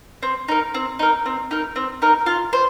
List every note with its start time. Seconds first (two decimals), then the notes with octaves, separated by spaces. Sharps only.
0.23 C4
0.48 D#4 A#4
0.74 C4
0.99 D#4 A#4
1.26 C4
1.51 D#4 A#4
1.76 C4
2.02 D#4 A#4
2.26 F4
2.53 C5